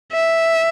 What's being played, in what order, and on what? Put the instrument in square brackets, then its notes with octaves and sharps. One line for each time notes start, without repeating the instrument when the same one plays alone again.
[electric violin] E5